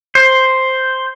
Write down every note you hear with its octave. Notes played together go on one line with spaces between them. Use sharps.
C5